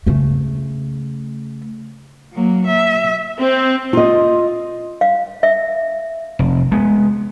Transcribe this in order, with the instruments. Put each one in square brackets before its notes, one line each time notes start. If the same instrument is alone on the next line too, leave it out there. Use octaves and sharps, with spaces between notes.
[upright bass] C#3 A3
[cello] F#3 A#3
E5
[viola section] C4
[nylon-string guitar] F4 D#5
[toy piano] F5
E5
[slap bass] F1
G#3 B3